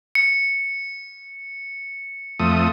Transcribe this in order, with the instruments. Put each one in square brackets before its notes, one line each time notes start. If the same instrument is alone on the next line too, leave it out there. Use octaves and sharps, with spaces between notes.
[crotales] C#7
[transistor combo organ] F2 A3 D#6